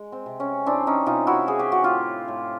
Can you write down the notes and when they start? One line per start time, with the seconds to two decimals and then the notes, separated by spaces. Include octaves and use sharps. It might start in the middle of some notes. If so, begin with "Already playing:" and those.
Already playing: G#3
0.12 C4
0.26 C3
0.40 C#4
0.66 E3 C4 D4
0.87 C#4 D#4
1.06 C3 D#4 F4
1.27 E4 F#4
1.47 E3 G#4
1.59 G4
1.72 F#4
1.84 A2 F4 G4
2.28 A2